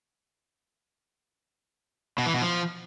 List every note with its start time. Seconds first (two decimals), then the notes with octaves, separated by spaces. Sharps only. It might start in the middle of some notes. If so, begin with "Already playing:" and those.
2.18 B2
2.26 E3
2.34 B2
2.42 F3